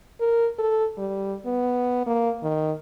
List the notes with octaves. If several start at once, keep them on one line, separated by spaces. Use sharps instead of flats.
A#4
A4
G3
B3
A#3
D#3